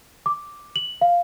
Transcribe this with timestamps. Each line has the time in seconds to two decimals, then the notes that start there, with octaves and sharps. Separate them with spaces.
0.26 D6
0.76 F#7
1.01 F5